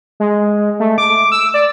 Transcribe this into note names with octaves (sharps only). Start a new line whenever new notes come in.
G#3
A3
D6
E6
D5